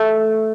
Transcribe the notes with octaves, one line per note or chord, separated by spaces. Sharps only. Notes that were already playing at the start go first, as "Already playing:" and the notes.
Already playing: A3